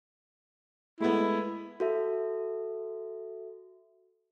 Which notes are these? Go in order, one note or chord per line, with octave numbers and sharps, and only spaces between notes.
G#3 A3 B3 E4
F#4 A4 E5